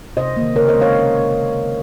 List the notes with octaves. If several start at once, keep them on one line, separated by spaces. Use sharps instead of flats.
C3 C5 D#5
D#3 A#3
C#3 A#4 C#5
C5 D#5
G#3
C#5 F5